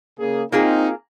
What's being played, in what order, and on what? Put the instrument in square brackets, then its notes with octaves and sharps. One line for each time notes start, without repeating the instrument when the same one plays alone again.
[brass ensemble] C#3 A#3 G#4
[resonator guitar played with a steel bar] A#3 F4 G#4 [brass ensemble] C4 D#4